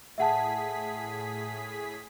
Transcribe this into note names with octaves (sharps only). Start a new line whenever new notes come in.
A2 G#4 E5 F#5 A5 B6